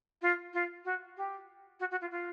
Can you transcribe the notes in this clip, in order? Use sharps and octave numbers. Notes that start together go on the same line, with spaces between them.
F4
F4
F#4
G4
F#4
F#4
F4
F4